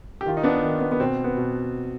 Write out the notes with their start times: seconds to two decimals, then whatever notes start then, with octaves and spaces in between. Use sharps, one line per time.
0.21 G4
0.26 D#3 F4
0.37 D#4
0.44 B3 D4
0.63 D#3
0.81 B3
0.92 B3
1.00 B2 C4
1.24 B3
1.37 B2